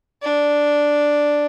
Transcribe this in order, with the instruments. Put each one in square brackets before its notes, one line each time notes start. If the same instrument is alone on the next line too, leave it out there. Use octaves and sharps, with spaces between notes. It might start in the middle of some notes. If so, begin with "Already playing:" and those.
[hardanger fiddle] D4